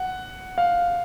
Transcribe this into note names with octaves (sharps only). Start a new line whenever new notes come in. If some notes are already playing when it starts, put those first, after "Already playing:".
Already playing: F#5
F5